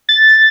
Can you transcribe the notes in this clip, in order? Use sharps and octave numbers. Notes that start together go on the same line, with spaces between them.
A6